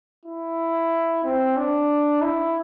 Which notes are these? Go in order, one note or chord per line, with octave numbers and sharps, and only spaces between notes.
E4
C4
D4
E4